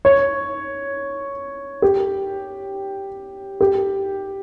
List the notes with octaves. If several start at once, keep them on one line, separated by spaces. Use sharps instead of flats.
C#5
G4
G4